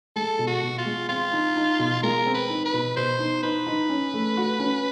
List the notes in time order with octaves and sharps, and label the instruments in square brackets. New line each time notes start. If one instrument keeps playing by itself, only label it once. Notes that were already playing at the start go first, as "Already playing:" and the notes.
[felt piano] G#3 [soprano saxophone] A4
[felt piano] B2
[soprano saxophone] F#4
[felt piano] B2
[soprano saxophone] F4
[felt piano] G#3
[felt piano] C4 [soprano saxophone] F4
[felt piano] D#4
D#4
B2
[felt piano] G#3 [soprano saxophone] A#4
[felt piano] C4
[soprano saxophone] B4
[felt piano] D#4
[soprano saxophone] B4
[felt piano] B2
[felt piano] B2 [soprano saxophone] C5
[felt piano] D#4
[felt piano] D#4 [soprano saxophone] B4
[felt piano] D#4
C#4
A3
F#4
C#4